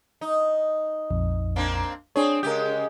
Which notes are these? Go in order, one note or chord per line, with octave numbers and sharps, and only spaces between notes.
D#4
A#1 F2
A#3 C4 D4
C4 D4 G#4 C#5
C#3 G#3 G4 A#4 G6